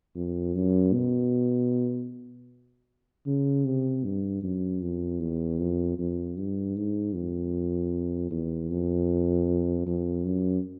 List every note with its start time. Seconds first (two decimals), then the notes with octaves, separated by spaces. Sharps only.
0.15 F2
0.54 F#2
0.93 B2
3.26 C#3
3.65 C3
4.04 G2
4.42 F#2
4.81 F2
5.20 E2
5.59 F2
5.98 F2
6.36 G2
6.76 G#2
7.14 F2
8.31 E2
8.70 F2
9.86 F2
10.25 F#2